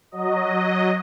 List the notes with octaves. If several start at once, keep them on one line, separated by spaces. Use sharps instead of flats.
F#3 D#5